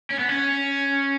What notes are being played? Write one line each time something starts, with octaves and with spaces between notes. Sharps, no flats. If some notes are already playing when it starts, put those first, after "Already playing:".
C#4
B3
C#4